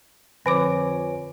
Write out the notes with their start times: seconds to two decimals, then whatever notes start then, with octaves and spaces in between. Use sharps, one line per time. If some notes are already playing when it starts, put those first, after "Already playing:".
0.46 F2 D3 B4 C#5 G#5 D6 D7